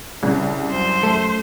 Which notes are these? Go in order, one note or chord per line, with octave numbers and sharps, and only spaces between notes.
C2 C#3
F#2 C5
F#2 A3 A4